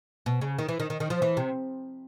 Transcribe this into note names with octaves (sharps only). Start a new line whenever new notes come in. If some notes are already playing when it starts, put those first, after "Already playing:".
B2
C#3
D#3
E3
D#3
D#3
D#3
F3
E3
C3